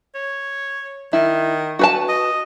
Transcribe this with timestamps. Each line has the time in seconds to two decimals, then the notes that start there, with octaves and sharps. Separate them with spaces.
0.15 C#5
1.13 D#3 E4
1.79 F#4 B4 A5
2.09 D#5